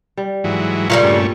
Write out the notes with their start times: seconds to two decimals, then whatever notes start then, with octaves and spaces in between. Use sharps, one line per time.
0.17 G3
0.44 G#2 E3 F#3
0.90 A#2 C#3 E3 G3 A#4 C#5 F5 G5
1.03 G2 A3 C#4